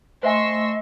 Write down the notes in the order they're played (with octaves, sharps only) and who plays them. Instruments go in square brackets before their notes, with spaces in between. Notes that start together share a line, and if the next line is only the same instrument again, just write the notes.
[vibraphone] A3 [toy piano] C5 E5 G#5 [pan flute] D#5 [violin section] C6 C#6 E6